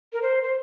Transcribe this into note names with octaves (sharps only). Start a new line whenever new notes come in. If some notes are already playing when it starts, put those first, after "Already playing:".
A#4
C5
C5